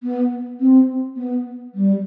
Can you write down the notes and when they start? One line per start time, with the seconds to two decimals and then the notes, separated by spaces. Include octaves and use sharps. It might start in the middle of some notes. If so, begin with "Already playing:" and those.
0.03 B3
0.61 C4
1.17 B3
1.75 G3